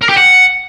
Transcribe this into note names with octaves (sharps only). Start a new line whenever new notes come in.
A#4
G4
F#5